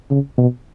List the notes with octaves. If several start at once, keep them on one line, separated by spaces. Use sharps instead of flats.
C#3
B2